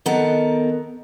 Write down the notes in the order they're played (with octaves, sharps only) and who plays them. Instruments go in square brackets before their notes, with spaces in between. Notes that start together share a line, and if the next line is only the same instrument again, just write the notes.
[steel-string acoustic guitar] D#3 B3 A4 A#4 F#5